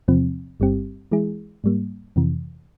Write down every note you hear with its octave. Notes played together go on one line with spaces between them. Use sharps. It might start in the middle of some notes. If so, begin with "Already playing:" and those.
E2 C3 F3 C4
G1 G2 G3 C4 G4
E3 G#3 E4 G#4
G#2 G3 A#3
F2 C3 E3